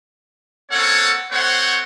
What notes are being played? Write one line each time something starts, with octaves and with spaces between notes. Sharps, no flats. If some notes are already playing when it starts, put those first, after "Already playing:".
A#3 C4 C#4 A4 C#5 F#5
A3 C4 C5 C#5 F#5